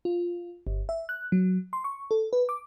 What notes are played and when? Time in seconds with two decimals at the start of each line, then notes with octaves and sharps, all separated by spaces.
0.05 F4
0.67 G1
0.89 E5
1.09 F#6
1.32 F#3
1.73 C6
1.84 C#6
2.11 A4
2.33 B4
2.49 D6